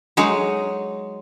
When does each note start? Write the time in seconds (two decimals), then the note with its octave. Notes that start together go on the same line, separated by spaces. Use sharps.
0.17 F#3 G#3 D#4